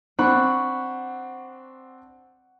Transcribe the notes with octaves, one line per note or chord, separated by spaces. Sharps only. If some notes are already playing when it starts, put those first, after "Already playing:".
C4 D4 F#5 B5 C#6